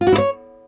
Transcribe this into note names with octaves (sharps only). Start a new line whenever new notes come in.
F4
F#4
E4
C#5